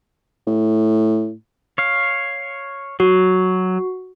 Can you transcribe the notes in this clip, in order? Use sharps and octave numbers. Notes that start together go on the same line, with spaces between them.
A2
C#5 F5
F#3 F#4